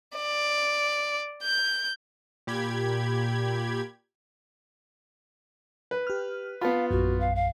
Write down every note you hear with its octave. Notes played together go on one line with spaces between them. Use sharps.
D5
G6
A#2 G4 B5 G#6
B4
G4 F6
B3 F4 F5 A5 B5
A#1 F#2 F#4
F5
F5